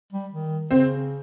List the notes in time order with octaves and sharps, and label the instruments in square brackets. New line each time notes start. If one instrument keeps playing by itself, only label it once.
[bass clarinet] G3
D#3
[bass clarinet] C#3 [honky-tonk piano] C4